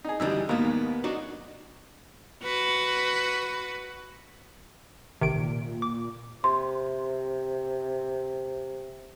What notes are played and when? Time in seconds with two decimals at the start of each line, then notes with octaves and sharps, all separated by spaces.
0.04 D#4 G#4
0.20 F#2 D3 E3 G3 D#4 E6
0.49 D#2 G#2 B2 A#3 B3
1.04 F#3 D4 D#4 F#4 D5
2.43 F#4 B4
5.21 A1 C3 D#3 D7
5.35 A#2
5.82 D6
6.44 C3 C6